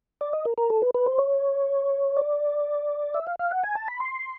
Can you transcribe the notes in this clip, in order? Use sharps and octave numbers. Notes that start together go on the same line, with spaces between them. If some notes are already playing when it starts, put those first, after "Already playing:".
D5
D#5
A#4
A#4
A4
B4
B4
C5
C#5
D5
E5
F5
F5
F#5
G#5
A5
B5
C6